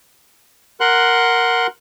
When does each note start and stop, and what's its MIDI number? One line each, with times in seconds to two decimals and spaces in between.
0.80 1.67 70
0.80 1.67 78
0.80 1.67 84
0.80 1.67 90